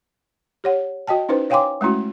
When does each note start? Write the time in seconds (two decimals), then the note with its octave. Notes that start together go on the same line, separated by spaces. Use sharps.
0.64 G4 C#5 F#5
1.08 F#4 D#5 G5 A5
1.29 C#4 D#4 E4 B4 C5
1.50 C#5 F5 G5 G#5 C6 D6
1.81 G#3 A3 C#4 E4 F#4